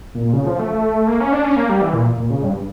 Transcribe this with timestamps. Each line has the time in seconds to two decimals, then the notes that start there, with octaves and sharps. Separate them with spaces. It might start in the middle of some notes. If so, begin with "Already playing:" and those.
0.15 A#2
0.33 C#3
0.47 F3
0.59 A3
1.07 A#3
1.20 C#4
1.32 D4
1.44 C#4
1.57 A#3
1.69 G3
1.81 E3
1.93 A#2
2.18 A#2
2.30 C#3
2.43 G2